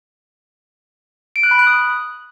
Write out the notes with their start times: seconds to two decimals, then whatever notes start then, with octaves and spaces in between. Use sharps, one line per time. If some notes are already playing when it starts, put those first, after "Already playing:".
1.36 D7
1.43 F#6
1.51 B5
1.59 F#6
1.67 D#6